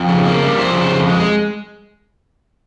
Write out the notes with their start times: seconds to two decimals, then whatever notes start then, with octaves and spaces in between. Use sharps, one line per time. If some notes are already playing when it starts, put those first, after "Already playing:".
Already playing: F2
0.08 C#3
0.25 A#3
0.43 G3
0.58 F2 C5
0.75 C#3
0.92 F2
1.09 G#3